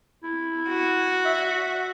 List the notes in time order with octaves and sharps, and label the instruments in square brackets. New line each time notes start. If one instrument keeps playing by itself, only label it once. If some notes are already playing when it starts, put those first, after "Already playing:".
[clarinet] E4
[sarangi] F#4
[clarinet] E5